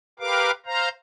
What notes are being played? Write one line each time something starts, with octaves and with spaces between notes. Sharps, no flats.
G4 A#4 B4 F5 D6
C5 F5 A#5